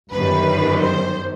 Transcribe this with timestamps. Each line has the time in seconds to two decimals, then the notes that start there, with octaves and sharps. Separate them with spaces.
0.11 G1 F#2 D#3 G3 B4
0.80 C5